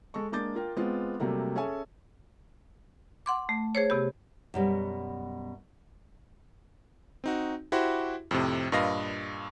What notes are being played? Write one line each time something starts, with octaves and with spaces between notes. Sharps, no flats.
G#3 A4 C#6
G#3 A#3 D4 D6 G6 A6
F4 A#4 G5
G#3 B3 C4 F4
C3 F#3 G3 A3 A#3
C#4 G#4 A4 E5 G#5 C#6
F#5 C6 D6
A3
G#4 C5 C#5
C3 B3 G4
F#2 B2 G3
C4 D#4 F#4
E4 F#4 G4 C5
F2 A2 C3
G2 A#2 B4 D#5 F5 A#6